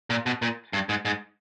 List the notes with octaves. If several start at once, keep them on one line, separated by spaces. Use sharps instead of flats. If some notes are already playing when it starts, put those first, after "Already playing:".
A#2
B2
A#2
G2
G#2
G#2